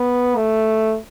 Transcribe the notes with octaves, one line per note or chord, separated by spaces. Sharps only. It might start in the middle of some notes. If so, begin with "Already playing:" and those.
Already playing: B3
A3